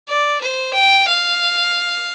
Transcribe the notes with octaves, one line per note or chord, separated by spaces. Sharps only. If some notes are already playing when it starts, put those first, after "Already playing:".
D5
C5
G5
F5